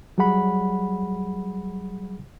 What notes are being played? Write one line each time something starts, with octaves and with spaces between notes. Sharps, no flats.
F#3 G3 G#4 F#5 B5